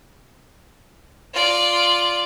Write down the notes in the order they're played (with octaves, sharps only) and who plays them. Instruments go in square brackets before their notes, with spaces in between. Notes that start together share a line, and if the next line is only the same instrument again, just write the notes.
[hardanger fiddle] F4 D5